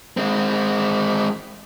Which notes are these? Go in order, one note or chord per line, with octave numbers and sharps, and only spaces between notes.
G#3 C4